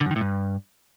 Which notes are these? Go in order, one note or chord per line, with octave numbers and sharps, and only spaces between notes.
D3
F#2
D#3
A2
G2